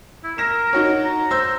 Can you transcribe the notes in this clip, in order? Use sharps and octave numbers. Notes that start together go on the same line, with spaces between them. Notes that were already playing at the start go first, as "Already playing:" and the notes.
E4
A#4 A#6 E7
D#4 F#4 C#5
A#5
C5 E6 G6